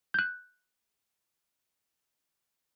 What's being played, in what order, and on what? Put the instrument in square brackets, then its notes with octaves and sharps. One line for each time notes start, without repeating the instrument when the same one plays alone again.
[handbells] F#6 G6